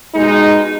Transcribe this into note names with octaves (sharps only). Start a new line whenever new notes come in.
B2 G#3 D#4